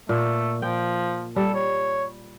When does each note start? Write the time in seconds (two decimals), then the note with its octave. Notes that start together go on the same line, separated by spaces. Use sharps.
0.09 A#2 A3
0.62 F3 G5
1.36 G3 A4
1.55 C#5